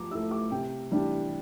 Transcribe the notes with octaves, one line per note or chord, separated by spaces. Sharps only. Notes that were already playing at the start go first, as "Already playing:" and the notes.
Already playing: F3 A#5 D6
A3 E4 E6
D6
C3 G5
E3 G3 D4